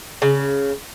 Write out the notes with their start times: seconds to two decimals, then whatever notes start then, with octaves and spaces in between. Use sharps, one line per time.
0.22 C#3